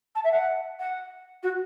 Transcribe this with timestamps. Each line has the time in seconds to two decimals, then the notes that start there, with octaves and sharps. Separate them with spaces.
0.15 A5
0.24 E5
0.31 F#5
0.79 F#5
1.43 F#4